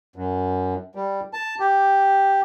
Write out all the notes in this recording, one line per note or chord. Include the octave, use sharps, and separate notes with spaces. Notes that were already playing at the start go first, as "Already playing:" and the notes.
F#2
G3
A5
G4